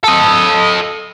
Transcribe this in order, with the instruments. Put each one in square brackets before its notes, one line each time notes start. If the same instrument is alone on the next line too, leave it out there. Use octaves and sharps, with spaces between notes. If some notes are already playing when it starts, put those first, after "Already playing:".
[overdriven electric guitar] A4 D#5